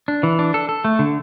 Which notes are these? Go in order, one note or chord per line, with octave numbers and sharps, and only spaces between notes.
D4
E3
D4
A4
A4
A3
D3